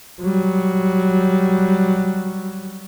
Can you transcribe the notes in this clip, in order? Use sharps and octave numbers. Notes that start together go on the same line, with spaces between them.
F#3 G3